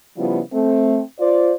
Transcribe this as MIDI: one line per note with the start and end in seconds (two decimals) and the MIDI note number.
0.17 0.40 49
0.17 0.40 53
0.17 0.40 55
0.17 0.40 59
0.17 0.40 64
0.17 0.40 65
0.53 1.01 57
0.53 1.01 60
1.20 1.54 65
1.20 1.54 72
1.20 1.54 74